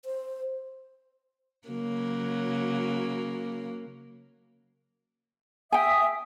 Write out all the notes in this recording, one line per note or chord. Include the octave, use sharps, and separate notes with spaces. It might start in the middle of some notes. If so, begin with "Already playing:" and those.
C5
C#3 F#3 A#3
E5 G5 G#5 D#6